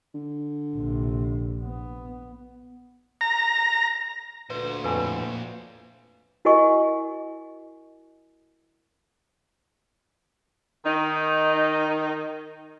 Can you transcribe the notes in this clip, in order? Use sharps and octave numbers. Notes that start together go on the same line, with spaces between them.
D3
A#1 C3
B3
A#5
D2 A#2 B4 C5
F2 A2 B4 G#5
E4 F#4 A#4 D#5 G#5 C#6
D#3 D#4